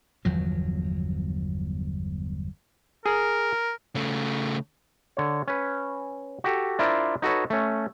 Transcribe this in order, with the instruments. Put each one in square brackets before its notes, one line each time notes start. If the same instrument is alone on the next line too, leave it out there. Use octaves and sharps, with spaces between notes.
[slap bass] G1 E2 F3 F#3
[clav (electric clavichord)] G#4 [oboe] A#4
[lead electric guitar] C#3 A3
[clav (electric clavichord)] D3 C#5
C#4 B4
F#4 G4 A4
D4 E4 F4 A#4 C5 D5
D#4 F#4 A4 B4 C#5
A3 C#4